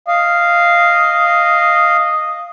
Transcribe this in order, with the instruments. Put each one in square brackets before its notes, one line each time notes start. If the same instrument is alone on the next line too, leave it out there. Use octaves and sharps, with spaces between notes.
[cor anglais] D#5 [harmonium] F5